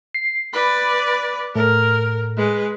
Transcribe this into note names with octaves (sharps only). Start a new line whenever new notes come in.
C7
B4 D5 B5
A2 A#4
G#3 B4